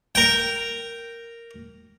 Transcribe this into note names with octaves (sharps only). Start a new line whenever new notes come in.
A#4 G5